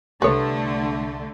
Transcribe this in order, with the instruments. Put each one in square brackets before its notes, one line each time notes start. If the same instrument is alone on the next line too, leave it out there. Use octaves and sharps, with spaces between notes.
[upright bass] C2 [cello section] D3 A3 [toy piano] G4 A4 [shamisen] B4 C#5